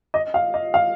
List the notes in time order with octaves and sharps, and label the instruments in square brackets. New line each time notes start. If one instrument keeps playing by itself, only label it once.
[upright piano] D#5
F5
D#5
F5